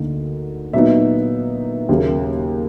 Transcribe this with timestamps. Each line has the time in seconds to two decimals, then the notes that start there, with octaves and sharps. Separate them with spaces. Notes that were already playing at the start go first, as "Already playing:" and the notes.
Already playing: D2 D3 A#3 D#4
0.73 A#2 F#3 B3 D#4 E5
1.89 D#2 C#3 F#3 A#3